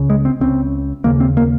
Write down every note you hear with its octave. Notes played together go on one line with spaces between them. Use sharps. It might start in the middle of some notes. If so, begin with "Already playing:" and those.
Already playing: C#2 C#3
G#3
C4
C#2 C#3 C4
D#2 C#3 A#3
C4
A#3